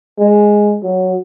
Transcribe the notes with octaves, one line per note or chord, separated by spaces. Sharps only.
G#3
F#3